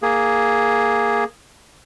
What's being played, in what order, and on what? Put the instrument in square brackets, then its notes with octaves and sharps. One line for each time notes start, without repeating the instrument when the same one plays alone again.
[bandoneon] A#3 G#4